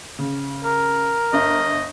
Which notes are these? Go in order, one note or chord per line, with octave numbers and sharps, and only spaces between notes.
C#3
A#4
G1 D#5 E5